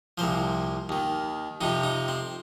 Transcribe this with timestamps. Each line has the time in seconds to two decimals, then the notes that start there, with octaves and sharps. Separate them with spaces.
0.18 C2 A#2 F3 C5
0.89 D#2 D#3
1.61 F2 C3 F3 D#4
1.83 D#4
2.08 C4